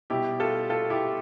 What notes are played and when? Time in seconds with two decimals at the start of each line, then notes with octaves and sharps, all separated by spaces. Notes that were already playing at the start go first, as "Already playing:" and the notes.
0.10 B2 G3 E4 G4
0.40 F4 A4
0.70 F4 A4
0.90 E4 G4